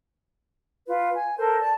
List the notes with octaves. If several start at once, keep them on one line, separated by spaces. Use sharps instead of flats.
F4 B4
G#5
A4 A#4 C5
D5 A5